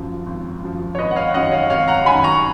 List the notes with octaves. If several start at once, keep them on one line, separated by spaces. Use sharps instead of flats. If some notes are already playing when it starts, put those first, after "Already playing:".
Already playing: G#1 F#2 F3
G#1
F#2 F3
C#5
G#1 B4 D#5
F#5
C#5 F5
F#2 D#3 D#5 F#5
C#5 F5
G#1 C#5 F5
F#5 A#5
F#2 D#3 G#5 B5
A#5 C#6